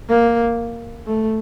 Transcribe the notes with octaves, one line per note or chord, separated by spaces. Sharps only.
A#3
A3